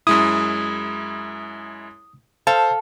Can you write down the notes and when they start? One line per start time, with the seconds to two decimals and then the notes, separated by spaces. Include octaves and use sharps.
0.07 F#2 G#3 E4 D#6
2.47 A4 C5 F5 A5